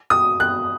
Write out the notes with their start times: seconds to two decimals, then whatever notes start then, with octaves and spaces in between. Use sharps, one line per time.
0.10 D#6
0.40 F#6